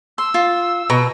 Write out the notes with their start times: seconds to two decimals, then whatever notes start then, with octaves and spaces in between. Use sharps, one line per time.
0.18 C6 E6
0.34 F4
0.90 B2 A#5